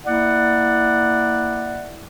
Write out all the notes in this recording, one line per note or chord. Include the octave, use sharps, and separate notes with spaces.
A#3 E4 D5 F#5